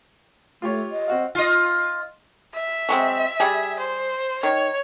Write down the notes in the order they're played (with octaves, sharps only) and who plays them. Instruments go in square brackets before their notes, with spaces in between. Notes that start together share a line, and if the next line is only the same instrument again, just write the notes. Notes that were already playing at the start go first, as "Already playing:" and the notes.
[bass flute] A3 [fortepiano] F4 G4 C#5
[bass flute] D#5
[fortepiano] C4 F#4 F5
[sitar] F4 D#5
[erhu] E5
[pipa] F#3 G#3 C4
G3 G4 G#4
[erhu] C5
[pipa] D#3 [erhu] C#5